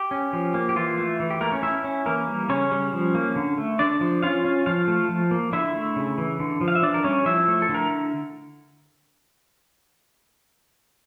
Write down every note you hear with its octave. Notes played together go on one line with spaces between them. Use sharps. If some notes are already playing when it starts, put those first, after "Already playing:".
Already playing: G4
C#4
F3
A#3
G4
E3 F4
A3
E3
G4
A3 A#3 A#4
C#4 C#5
C#4 E4 E5
C#4
E3 A#3 A#4
G3
C#3 C#4 C#5
G3
F3
A#3
D3
A3
D3 D4 D5
F3
C#4 F4 F5
C#4
F3 F4 F5
A3
F3
A#3
D3 E4 E5
A3
C#3
E3
D3
F3
F5
E5
E3 D4 D5
A#4
G3 C#4 C#5
F3 E4 E5
A3
A4
D3
A#4